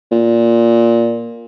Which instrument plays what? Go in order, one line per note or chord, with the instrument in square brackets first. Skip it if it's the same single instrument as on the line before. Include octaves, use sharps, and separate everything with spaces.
[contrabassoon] A#2